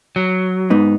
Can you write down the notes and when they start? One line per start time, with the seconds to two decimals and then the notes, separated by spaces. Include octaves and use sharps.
0.16 F#3
0.70 G#2 B3 D#4